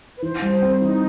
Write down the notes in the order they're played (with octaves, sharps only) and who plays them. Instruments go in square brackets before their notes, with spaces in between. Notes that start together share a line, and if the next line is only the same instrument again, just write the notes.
[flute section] B4
[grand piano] E3 [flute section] C5
[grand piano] G3
C4
[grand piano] E3 [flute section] D#4